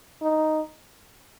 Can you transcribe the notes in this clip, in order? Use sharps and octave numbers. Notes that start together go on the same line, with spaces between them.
D#4